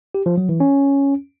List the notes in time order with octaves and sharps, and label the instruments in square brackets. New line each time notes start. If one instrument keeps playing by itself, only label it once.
[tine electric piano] G4
F3
F#3
E3
C#4